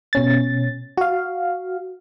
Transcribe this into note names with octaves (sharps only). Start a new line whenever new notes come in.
B2 C#4 A6
F#4 F5